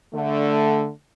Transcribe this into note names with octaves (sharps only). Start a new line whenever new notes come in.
D3 A3